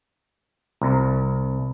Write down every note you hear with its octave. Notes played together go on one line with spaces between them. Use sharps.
C2